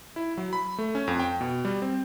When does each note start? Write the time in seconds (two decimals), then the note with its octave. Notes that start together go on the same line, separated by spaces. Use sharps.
0.16 E4
0.37 F#3
0.53 B5
0.78 A3
0.95 C#4
1.08 F2
1.20 G5
1.41 B2
1.65 G3
1.82 C4